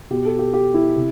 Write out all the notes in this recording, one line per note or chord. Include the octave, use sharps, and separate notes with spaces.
B2 G4
A4
G4
G4
E4
C3